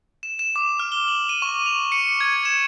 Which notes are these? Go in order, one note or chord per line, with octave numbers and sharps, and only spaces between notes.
E7
E7
D6
F6
G7
F#7
D#7
C#6
F7
C#7
G#6
E7